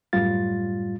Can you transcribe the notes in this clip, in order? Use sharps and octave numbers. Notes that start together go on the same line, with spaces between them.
F#2 A2 G3 F4 A6